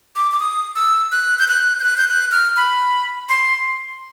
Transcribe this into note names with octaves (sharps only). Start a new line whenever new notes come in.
D6
D6
D#6
E6
F#6
G6
F#6
G6
F#6
G6
F#6
F6
B5
C6